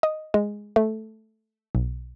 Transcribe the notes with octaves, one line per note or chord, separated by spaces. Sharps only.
D#5
G#3
A3
B1